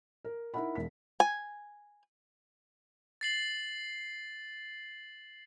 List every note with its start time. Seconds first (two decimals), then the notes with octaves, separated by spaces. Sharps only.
0.24 A#4
0.54 D#4 E4 A#4 E5 F#5 B5
0.75 E1 B6
1.20 G#5
3.21 A6 C7 F#7